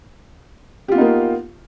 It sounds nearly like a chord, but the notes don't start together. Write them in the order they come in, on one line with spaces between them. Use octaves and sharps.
G4 F4 B3 D#4 A#3